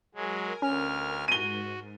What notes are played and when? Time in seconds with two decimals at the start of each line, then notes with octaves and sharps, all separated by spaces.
0.15 F#3 G#3 A#4 G#5
0.62 D2 C#4 F6
1.28 G#2 F#4 D#7 G7